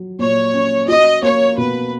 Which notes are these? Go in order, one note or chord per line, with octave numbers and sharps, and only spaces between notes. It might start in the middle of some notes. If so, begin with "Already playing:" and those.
Already playing: F#3
A#2 C#5
C#4
F#4 D#5
A#3 C#5
B2 B4